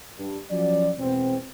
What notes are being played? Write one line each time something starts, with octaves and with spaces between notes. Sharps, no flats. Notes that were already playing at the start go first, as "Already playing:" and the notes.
G2
F3 F#3 C#4 D5
E2 B2 G#3 B3 C4